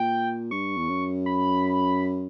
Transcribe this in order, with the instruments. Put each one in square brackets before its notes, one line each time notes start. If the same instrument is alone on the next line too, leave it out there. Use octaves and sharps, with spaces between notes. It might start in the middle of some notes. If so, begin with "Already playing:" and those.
Already playing: [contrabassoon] A#2 [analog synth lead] G5
[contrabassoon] G2 [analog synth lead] C#6
[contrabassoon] E2
F#2
[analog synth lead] B5